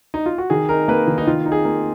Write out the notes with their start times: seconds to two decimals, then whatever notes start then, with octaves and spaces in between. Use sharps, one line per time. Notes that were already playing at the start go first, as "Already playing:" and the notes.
0.14 D#4
0.26 F4
0.38 F#4
0.50 D#3 G#4
0.69 D#4 A#4
0.88 A#3 B4
1.08 D#3
1.18 D#4
1.27 D#3 F4
1.46 D#4
1.52 G#4
1.65 A#3